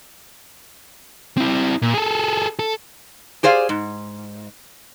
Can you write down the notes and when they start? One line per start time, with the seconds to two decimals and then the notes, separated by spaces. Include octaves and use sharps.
1.38 C4 E4
1.82 A#2
1.94 G#4 A4
2.59 A4
3.43 G4 G#4 C5 D5 F5
3.69 G#2